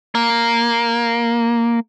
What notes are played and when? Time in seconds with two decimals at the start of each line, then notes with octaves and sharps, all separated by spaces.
0.15 A#3